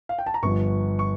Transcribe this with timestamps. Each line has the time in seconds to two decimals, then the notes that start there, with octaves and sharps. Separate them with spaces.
0.09 F5
0.19 G5
0.26 A5
0.34 A#5
0.43 G1 G2 F3 C#6
0.99 C#6